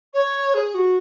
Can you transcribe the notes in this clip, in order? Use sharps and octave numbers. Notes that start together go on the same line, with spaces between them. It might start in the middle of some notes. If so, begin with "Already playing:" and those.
C#5
G#4
F#4